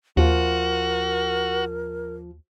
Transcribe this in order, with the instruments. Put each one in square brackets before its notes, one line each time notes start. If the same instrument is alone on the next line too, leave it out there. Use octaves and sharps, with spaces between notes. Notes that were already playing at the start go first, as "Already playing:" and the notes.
[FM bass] D#2 [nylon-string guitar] F3 F4 [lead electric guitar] F#4 [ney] A#4